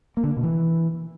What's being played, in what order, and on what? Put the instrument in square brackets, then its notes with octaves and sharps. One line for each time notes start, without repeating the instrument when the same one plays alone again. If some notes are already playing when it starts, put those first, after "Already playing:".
[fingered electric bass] A#3
D3
A#3
B2
E3